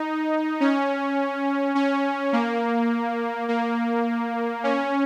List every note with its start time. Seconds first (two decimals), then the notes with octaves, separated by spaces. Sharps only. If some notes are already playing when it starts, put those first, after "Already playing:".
Already playing: D#4
0.60 C#4
1.75 C#4
2.33 A#3
3.48 A#3
4.64 C#4